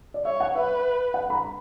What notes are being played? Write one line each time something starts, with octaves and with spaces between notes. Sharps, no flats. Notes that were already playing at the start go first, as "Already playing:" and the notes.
D5
C#5 E5
F#5
B4 E5
F#5
B5
A#5